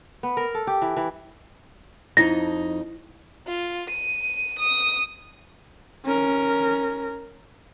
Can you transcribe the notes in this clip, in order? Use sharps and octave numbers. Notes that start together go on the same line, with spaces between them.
B3
A#4
A4
G4
E3
E3
F2 D#4 E4 A#6
F4
D#7
D#6
C#4 A#4